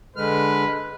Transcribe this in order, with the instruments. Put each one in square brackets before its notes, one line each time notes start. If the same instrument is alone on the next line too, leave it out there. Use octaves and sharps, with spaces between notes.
[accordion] D3 G#3 F6 [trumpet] B4